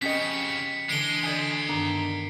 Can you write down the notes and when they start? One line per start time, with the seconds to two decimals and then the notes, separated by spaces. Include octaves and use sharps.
0.02 F2 C#3 C#4 G4 D#5 B6 C#7
0.89 D3 E3 G#3 C7 D7 G7
1.23 D2 D5 D#5 G#5 D#6 G#6
1.68 G2 D#3 B3 D4 A#5